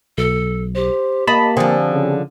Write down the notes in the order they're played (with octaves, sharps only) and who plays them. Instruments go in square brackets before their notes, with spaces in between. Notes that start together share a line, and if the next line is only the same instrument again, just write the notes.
[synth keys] B1 [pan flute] A4
[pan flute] G4 [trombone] C5
[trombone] A#3 [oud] D#5 [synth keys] A5 B5
[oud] D3 F3 [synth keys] C4 G#4
[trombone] C#3